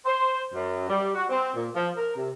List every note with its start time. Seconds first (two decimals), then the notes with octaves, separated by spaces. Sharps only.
0.05 C5
0.53 F#2
0.88 G3
1.15 F#4
1.29 C4
1.54 A#2
1.74 F3
1.96 A#4
2.16 C3